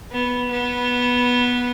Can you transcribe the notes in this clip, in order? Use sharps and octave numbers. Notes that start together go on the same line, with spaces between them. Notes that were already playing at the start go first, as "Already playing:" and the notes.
B3
B3